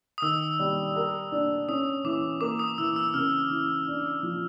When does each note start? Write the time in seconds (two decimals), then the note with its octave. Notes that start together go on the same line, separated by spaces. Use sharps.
0.18 D#6
0.22 D#3 E6
0.59 G3
0.96 A#4
1.32 D4
1.69 C#4 D#6
2.04 E3 D6
2.41 A#3 D6
2.59 D#6
2.78 E3 E6
2.96 E6
3.14 C#3 F6
3.50 E3
3.87 D4
4.23 F3